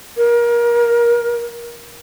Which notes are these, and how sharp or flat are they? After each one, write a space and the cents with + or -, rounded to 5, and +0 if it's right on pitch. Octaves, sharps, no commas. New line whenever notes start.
A#4 +25